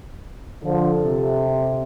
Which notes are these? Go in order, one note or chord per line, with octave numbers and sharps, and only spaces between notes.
D3 F3 A4
C3